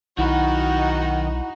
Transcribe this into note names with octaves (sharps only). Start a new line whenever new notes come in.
B1 D#3 D#4 E4 F#4 F#5 B5